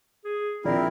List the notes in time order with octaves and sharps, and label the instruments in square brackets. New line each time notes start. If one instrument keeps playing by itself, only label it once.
[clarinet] G#4
[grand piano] A#1 D5 [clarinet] C4 [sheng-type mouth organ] E4 A#4